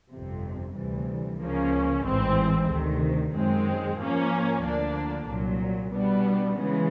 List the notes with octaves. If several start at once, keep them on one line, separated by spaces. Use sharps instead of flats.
G1 F2 C3
D2 C3 E3 G3
C#2 C#3 F3 A#3 C#4
A1 G#2 E3 G#3 C4
D2 C3 D#3
F#2 D#3 G#3 C4
G#2 F3 A#3 C#4
D2 D3 F3 A#3 D4
C2 A#2 F#3
B2 G3 B3 D4
C#3 E3 G#3 B3